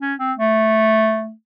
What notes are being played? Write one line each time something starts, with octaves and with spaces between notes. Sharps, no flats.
C#4
C4
A3